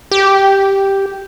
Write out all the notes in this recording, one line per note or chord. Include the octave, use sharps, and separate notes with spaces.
G4